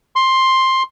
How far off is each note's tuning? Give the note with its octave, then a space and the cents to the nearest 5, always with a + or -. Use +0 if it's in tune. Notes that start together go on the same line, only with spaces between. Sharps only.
C6 +10